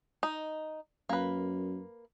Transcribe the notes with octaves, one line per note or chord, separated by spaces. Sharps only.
D#4
F#2 A#3 B4